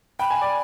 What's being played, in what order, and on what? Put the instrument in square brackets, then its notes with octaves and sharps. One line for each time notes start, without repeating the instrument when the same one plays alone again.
[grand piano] G5 [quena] B5
[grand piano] G#5
D5